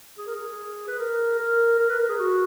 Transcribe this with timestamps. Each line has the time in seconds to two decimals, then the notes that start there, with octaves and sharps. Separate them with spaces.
0.18 G#4
0.27 A#4
0.35 G#4
0.88 B4
0.99 A#4
1.39 A#4
1.79 A#4
1.89 B4
1.99 A#4
2.09 G#4
2.19 F#4